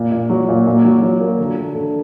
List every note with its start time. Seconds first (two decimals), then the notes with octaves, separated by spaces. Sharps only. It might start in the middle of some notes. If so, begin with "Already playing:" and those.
Already playing: A#2
0.12 A#2
0.29 F#3
0.48 A#2
0.66 A#2
0.85 F#3
1.02 F#3
1.21 A#3
1.39 D3
1.57 A3
1.75 D3